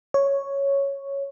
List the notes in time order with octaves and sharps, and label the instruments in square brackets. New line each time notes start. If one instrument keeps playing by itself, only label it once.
[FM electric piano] C#5